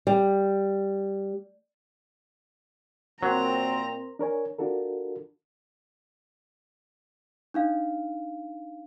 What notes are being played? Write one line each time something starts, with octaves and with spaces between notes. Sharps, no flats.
G3
A#2 F#3 C4 A#4 C5 A#5 C6
D4 A#4 C#5 G#5
D4 F4 F#4 A4 A#4
D4 D#4 F5